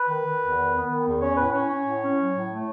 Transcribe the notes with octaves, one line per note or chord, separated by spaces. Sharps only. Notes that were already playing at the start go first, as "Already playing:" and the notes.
Already playing: B4
D#3
D#3
E2
D#3
B3
D#3
E2
C#4 C#5
A2 B4
C#4 C#5
C#4
A2
C#4
F#3
A2
A3